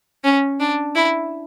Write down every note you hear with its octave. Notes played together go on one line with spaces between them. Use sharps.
C#4
D4
E4